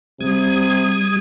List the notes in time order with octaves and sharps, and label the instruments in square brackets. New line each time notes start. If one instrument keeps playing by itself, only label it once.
[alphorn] C3 [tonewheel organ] G3 D#6 G#6